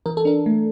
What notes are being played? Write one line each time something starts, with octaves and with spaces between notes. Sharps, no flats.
E3 A#4
A4
D4 A#4
A3